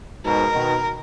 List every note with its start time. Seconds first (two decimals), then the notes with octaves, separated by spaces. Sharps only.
0.25 G#2 B2 A#4
0.54 B2 D#3